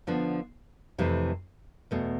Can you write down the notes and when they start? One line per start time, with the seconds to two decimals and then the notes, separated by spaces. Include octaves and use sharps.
0.07 D3 F3 B3 D4
0.98 F2 C3 E3 A3
1.91 E2 B2 A3